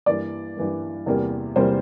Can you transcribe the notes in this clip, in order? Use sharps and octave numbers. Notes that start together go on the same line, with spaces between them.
G2 E3 A#3 D5
G2 E3 A#3
E2 C3 G3 A#3
E2 C3 G3 A#3 C5